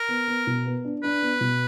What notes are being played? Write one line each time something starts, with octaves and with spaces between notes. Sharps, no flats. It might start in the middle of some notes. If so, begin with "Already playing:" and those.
Already playing: A#4
B3
B3
B2
B3
D4
D4 B4
B3
B2